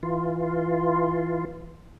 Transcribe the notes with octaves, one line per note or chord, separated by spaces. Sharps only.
E3 F4